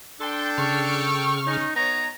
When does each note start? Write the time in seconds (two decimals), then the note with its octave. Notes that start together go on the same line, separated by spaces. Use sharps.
0.21 D4 A4 G5 C6
0.58 C#3 C#6 F6
1.47 C#4 D#4
1.76 B3 D#4 C#5 A#5